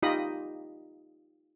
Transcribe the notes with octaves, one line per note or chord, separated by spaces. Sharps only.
D#4 F4 G4 D#5 B5 D#6